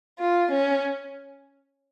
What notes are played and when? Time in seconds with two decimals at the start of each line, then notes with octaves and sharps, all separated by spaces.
0.19 F4
0.51 C#4